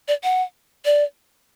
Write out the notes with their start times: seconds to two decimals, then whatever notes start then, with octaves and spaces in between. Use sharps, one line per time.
0.08 D5
0.24 F#5
0.85 D5